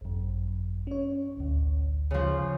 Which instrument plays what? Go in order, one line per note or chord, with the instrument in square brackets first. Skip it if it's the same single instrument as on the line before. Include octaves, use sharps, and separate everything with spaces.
[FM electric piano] G#1 F#2
C#4 C#5
A1 D2
[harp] C#3 F3